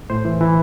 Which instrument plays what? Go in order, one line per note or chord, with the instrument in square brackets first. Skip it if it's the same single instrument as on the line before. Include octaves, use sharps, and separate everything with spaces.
[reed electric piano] A2 C5
E3
E3